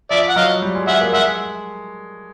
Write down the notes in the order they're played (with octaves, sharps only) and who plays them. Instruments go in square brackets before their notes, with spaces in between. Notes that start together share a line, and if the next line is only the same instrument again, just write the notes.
[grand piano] F3 [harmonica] D5 E5
[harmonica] F#5
[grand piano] F#3 [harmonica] D#5 F5
[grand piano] G3
G#3
[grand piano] G#3 [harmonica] E5 F#5
[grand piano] A#3
[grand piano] G#3 [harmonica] E5 F#5